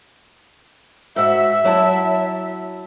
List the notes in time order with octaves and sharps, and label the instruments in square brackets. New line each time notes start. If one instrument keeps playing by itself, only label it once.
[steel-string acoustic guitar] G#2 F#4 [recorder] E5
[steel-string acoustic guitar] F#3 E4 A5